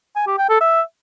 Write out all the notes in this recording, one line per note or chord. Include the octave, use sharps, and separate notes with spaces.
G#5
G4
G5
A4
E5